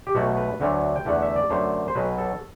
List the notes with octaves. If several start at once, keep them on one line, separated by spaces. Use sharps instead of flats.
G4
B1 B2 A3 F#4
B4
D2 D3 F#3 A3
G5
E2 D3 A3 F#5
E5
D5
F#2 D3 A3 C5
C5
B1 B2 F#3 B4
A4